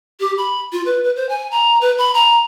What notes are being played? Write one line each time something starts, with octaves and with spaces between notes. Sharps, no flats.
G4
B5
F4
B4
B4
C5
G#5
A#5
B4
B5
A#5